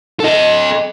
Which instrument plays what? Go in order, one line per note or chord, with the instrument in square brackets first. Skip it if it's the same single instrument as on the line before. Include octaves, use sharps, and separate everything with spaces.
[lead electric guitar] A4 D#5